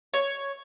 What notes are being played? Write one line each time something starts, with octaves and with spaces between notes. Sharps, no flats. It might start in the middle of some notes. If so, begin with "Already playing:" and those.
C#5